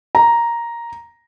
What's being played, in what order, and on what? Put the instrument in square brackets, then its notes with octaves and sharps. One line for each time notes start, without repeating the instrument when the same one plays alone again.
[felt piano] A#5